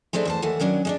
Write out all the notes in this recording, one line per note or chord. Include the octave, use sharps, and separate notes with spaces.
G#3 A3 C4 D4 E4
E2 C5 A5
D#2 E3 A3 F#5
D#3 F#3 C#4 D4
G#3 C#4 D4